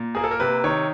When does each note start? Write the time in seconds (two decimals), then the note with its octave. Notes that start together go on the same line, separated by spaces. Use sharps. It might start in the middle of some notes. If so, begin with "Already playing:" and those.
Already playing: A#2
0.15 A#3 G#4
0.24 A4
0.31 A#4
0.40 C3 B4
0.64 D#3 C#5